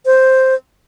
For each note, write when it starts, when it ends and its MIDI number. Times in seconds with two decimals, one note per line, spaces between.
0.06 0.54 72